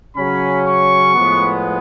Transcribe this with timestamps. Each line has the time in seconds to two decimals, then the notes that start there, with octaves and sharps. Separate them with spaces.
0.16 C#3 F#3 C#4 B5
0.66 C#6
1.14 A2 F3 G#3 B3